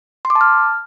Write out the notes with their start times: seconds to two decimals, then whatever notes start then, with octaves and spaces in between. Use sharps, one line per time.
0.25 C6
0.30 D6
0.35 A5
0.41 F6